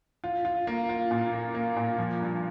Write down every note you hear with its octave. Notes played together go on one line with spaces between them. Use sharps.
F4
F4
A#3
F4
A#2
A#3
A#3
A#2
F3
G2